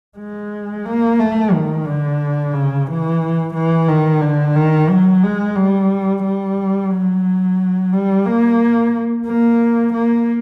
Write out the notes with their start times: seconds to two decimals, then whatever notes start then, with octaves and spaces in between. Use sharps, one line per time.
0.18 G#3
0.85 A#3
1.19 A3
1.53 D#3
1.86 D3
2.53 C#3
2.87 E3
3.54 E3
3.88 D#3
4.21 D3
4.55 D#3
4.89 F#3
5.23 G#3
5.56 G3
6.23 G3
6.91 F#3
7.92 G3
8.26 A#3
9.26 A#3
9.94 A#3